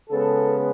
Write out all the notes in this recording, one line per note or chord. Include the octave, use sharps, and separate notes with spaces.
C#3 G#3 B3 A4